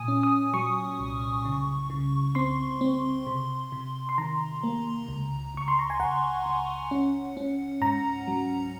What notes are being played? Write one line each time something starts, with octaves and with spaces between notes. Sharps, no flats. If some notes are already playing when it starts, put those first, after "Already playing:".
Already playing: A#2 G#5 D#6
C#4
D#6
F#3 C#6
C2
C#3
C#3
C4 C6
C4
C3
C3
C6
D#3 A#5
A#3
C#2
C#2 C#6
C6
A#5
G#5
C#2 F#5
C#2
C#4
C#4
G#2 A#5
F#3